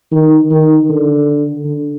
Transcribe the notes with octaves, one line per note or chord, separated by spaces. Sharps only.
D#3
D#3
D3
D3